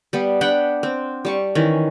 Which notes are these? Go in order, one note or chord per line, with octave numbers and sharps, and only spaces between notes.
G3 B3
D4 F#5 G5 B5
C4
G3 A5 C#6
D#3 E3 C#4